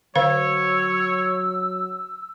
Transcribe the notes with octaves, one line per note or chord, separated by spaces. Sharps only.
D3 F#3 C5 C#5 F5 E6